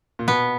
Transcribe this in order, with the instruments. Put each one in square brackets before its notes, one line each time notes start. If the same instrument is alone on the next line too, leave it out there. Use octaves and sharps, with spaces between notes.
[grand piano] A#2
[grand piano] B2 [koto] B3